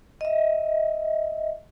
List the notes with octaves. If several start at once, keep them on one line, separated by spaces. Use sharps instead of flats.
D#5 E5